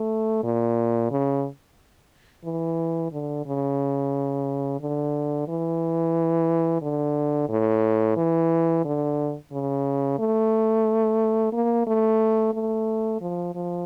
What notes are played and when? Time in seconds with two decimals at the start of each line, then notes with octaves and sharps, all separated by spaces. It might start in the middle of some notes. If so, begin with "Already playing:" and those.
Already playing: A3
0.43 A#2
1.11 C#3
2.45 E3
3.12 D3
3.46 C#3
4.80 D3
5.48 E3
6.82 D3
7.49 A2
8.16 E3
8.85 D3
9.52 C#3
10.19 A3
11.53 A#3
11.87 A3
12.54 A3
13.21 F3
13.55 F3